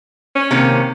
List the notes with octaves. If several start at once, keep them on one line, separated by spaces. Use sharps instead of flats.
C#4
C3 D#3 A#3